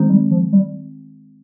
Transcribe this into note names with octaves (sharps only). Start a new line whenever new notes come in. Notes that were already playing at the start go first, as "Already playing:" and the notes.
Already playing: D#3 G#3 C4
G3
F3
G3